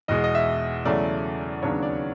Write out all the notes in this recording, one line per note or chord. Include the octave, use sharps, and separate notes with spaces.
E2 B2 G#3 D#5
D#5
E5
E2 C#3 F#3 A3 D5
D#2 C#3 F#3 B3 D4 C#5
D5